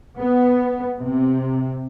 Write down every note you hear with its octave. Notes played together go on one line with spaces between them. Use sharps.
B3
C3